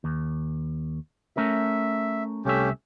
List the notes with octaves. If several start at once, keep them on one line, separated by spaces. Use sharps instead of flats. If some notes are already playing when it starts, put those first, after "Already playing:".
D#2
A3 C#4 A#4 E5
C2 A3 C#4 G4 E5